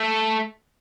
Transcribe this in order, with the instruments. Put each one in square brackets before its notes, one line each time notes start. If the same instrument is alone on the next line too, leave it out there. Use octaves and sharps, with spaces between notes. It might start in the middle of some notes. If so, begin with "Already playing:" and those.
Already playing: [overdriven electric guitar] A3